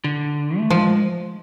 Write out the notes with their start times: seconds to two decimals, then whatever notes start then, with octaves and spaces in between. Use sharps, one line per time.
0.04 D3
0.58 A3
0.70 F3 G#3